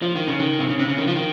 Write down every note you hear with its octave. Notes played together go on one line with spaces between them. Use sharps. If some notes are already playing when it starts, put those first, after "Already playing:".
F3
D#3
C#3
D#3
C3
C#3
C3
C#3
D#3
F3
D#3